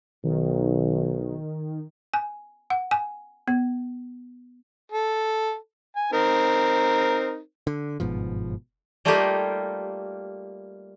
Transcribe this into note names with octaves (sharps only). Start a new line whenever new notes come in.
B1 D#3
G#5
F#5
G#5
B3
A4
G#5
C4 D#4 A#4
D3
G1 G#2 B2 F3
G3 A3 A#3 D#4 F4 G4